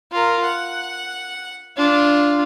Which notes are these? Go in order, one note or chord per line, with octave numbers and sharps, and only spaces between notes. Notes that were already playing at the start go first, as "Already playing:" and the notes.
F4 A#4
F#5
D4 F4